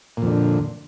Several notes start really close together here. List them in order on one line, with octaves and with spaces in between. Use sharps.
A#2 F2 D3